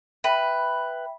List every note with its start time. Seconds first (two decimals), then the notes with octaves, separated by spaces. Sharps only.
0.24 B4 E5 G5